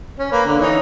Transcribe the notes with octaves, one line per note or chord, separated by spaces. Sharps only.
C#4
A#3 B4
D3
E3 D#4 C#5